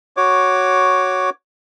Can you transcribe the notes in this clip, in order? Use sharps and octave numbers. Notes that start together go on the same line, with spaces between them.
F#4 C#5 D6